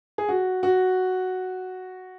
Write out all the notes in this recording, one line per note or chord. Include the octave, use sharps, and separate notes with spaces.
G#4
F#4
F#4